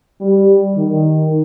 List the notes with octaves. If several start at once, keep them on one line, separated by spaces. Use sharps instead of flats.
G3
D#3